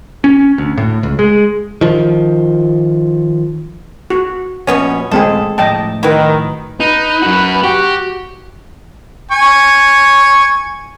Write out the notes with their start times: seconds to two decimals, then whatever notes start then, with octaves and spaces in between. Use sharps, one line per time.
0.24 C#4
0.58 D2
0.78 A2
1.03 C#2
1.19 G#3
1.81 D#3 F3
4.10 F#4
4.67 A#1 B2 B3 C#4
5.11 D1 A1 D#2 G#3 C4 G#4 A4
5.58 A2 F3 A3 D#5 G5 A5
6.03 D#3 E4 F#4 B4
6.80 D#4 B4
7.22 F#2 F#4
7.63 F#4 G4
9.32 G#5 C#6